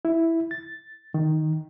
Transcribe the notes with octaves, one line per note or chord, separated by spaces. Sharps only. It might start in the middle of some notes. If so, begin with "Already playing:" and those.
E4
A6
D#3